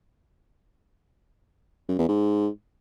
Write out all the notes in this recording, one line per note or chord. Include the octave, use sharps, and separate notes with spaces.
F#2
E2
G#2